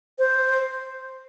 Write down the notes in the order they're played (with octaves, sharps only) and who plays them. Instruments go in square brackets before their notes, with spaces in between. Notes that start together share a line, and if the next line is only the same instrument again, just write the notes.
[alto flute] C5